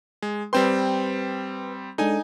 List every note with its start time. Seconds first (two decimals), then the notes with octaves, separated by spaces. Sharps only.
0.22 G#3
0.53 G3 C4 B4 G5 C6
1.98 G#3 D4 D#4 A4 G#5